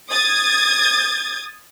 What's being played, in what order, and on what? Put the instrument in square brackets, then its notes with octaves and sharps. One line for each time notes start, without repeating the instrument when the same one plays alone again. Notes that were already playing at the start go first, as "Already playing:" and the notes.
[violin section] D#6 G#6 A6